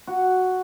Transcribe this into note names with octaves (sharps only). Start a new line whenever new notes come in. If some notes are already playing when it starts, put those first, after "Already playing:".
F#4